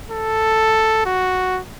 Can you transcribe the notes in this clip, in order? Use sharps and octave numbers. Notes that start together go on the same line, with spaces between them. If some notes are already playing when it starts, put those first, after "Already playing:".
A4
F#4